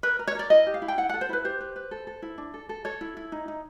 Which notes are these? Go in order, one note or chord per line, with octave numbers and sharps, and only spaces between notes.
A#4 B4
A#4
C#5
A#4 D5
E4 D#5
G4
F5
E4
G5
E4 F#5
A4 F#5
C5
E4 B4
G4 C5
B4
B4
A4
A4
E4
D4
A4
A4
A4 C#5
E4
E4
D#4
D#4